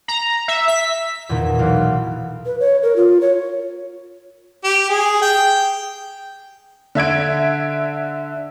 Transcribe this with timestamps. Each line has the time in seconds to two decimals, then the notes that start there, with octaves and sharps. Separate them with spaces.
0.08 A#5
0.48 E5
0.68 B6
1.29 E2 A#2 D#3
1.59 B1 E3 F5
2.46 B4
2.60 C#5
2.83 A#4
2.96 F4
3.21 C#5
4.64 G4
4.90 G#4
5.22 G5
6.95 D3 E5 G#6 D7